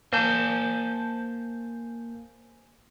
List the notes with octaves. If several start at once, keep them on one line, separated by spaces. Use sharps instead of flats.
A#3 C5 G#5 A5 G6